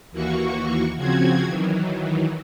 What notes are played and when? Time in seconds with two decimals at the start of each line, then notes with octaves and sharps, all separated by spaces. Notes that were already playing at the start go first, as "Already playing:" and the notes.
0.12 D#2 E3 A#3 F#4 C#6
0.96 C#3 F3 C4 F#4 G#6
1.46 D#3 E3 F#3